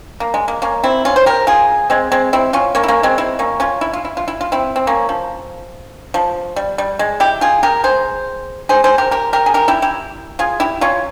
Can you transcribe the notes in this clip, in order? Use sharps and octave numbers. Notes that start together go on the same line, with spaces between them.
A#3
G#3
A#3
A#3 C#4
C4 E4
C#4 F4
C5
G4 A#4
F4 G#4
G#3 C4
G#3 C4
C4 E4
C#4 F4
A#3 C#4
E4
A#3 C#4
G#3 C4
C4 E4
A#3 C#4
C#4 F4
E4
F4
E4
F4
E4
F4
C4 E4
C4
A#3 C#4
F3
F3
G3
G3
G#3
E4 G4
F4 G#4
G4 A#4
G#4 C5
G#4 C5
G#4 C5
G4 A#4
G4 A#4
G4 A#4
G#4
G4 A#4
E4 G4
E4 G4
F4 G#4
E4 G4
C#4 F4